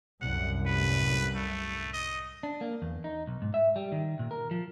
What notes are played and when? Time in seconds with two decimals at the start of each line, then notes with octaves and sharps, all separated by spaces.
0.22 C2 F#2 A2 F#5
0.66 B4
1.35 A3
1.93 D#5
2.43 D4
2.61 A#3
2.82 E2
3.04 D#4
3.27 B1
3.42 G#2
3.54 E5
3.76 G3
3.92 D#3
4.19 A#2
4.31 A#4
4.51 F3